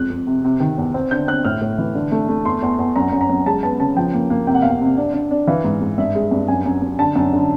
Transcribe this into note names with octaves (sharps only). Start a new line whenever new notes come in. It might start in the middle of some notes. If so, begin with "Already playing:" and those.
Already playing: F2 G#3 F#6
F2
C3
C3
D#3
E2
C4
D3 G6
C4 F#6
A2 F6
A2
E3
D3
A3
A3
E2 C6
E2
E2
F#2 A#5
F#2
A#5
F#2
G#3 A5
B3 A5
C#3 A5
F3 G5
A#3
A#3
C3 G5
F#5
E2 F5
F#5
C3
D4
D4
D4
E3 F5
G#2
G#2
G2 E5
G#3
G2
F#2 G#5
F#2
F#2
D3 A5
F#2
D3